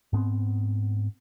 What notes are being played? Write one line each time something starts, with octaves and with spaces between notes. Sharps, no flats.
G#2 B3 C4